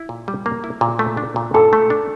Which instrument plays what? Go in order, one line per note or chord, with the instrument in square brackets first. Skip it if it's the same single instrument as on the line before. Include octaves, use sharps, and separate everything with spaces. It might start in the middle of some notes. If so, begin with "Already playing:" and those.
Already playing: [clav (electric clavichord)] E4
A#2
G3
A#3
E4
A#2
A3
D4
A#2
[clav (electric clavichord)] A#2 [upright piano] A4
[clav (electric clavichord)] A3
D4